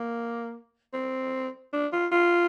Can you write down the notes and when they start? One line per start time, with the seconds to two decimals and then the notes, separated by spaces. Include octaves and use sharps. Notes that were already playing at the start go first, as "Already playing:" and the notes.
Already playing: A#3
0.93 C4
1.73 D4
1.93 F4
2.12 F4